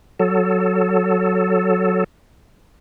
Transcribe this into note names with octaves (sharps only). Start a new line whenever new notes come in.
F#3 A4